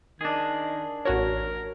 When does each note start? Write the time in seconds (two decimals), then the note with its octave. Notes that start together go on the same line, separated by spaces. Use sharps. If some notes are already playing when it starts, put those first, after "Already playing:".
0.21 D#3 D4 G#4
1.05 A1 F#4 A#4 C#5